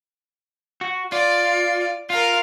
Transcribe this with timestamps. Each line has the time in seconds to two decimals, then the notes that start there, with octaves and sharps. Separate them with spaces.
0.81 F#4
1.12 F4 D5
2.10 F4 A#4 F5